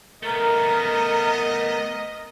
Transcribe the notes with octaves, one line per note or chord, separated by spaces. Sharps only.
A3 B3 A#4 D#5